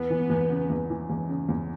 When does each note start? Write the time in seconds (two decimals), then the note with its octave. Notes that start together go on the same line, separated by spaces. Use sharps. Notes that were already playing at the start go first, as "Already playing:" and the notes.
Already playing: E2 B3
0.10 E3
0.30 E2
0.50 C#3
0.70 E2
0.90 E3
1.10 E2
1.29 C#3
1.49 E2